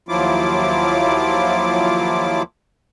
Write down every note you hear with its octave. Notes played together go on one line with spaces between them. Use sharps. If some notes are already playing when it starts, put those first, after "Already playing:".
D#2 F3 F#3 E4 F4 D6